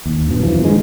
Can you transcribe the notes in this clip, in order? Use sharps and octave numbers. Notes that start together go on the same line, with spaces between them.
D#2
G2 B2
F#2 E3 F3
G2 D#3 G#3